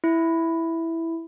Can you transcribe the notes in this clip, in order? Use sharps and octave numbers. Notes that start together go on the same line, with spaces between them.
E4